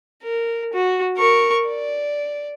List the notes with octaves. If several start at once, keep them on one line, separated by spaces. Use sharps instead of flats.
A#4
F#4
A#4 C#6
D5